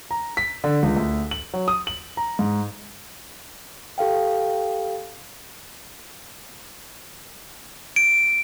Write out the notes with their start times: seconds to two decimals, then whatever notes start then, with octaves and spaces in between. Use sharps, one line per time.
0.11 A#5
0.37 B6
0.64 D3
0.83 C#2
0.97 D2
1.31 F#7
1.54 F#3
1.68 D#6
1.87 F#7
2.17 A#5
2.39 G#2
3.98 G4 A4 F5 G5
7.96 D7